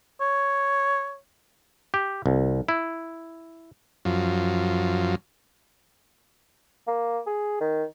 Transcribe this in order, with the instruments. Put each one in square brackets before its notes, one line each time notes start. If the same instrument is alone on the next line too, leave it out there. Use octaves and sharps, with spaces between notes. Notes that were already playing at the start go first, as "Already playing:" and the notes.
[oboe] C#5
[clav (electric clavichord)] G4
C2
E4
[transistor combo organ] F#2 F3
[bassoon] A#3
G#4
D#3